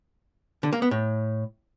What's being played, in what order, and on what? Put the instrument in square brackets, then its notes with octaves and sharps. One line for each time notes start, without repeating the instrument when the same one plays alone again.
[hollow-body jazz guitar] D3
A#3
B3
A2